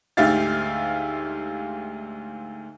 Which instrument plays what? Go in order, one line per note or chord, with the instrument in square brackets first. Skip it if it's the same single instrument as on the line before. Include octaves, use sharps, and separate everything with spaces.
[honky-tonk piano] D2 G#2 G4 E5 F5 A6